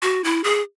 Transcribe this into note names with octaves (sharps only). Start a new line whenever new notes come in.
F#4
E4
G#4